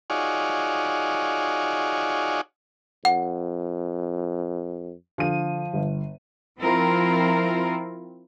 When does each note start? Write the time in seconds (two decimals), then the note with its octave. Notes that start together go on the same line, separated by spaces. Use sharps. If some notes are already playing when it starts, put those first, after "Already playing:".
0.10 D#4 F4 F#4 G#4 C#5 D5
3.05 F2 F#5
5.18 D3 F3 D#7
5.73 G1
6.61 F3 C4 E4 F4 A#4